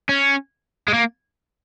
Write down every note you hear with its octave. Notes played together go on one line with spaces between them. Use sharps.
C#4
G#3
A#3